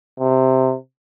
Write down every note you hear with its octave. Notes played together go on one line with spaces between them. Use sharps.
C3